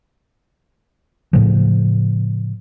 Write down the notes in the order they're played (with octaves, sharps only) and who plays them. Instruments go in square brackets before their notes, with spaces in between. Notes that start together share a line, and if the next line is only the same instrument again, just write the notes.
[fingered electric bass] A2 C#3 F3